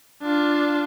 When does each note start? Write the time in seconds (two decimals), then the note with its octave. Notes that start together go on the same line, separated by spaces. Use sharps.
0.22 D4 F4